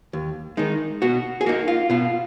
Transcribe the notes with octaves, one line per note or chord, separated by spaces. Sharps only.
D#2
D#3 G#3 D#4
B2 F#4
G#4
A#3 D#4 F#4
F4
B2 F4